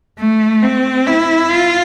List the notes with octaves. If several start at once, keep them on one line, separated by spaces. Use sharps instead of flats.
A3
C4
E4
F4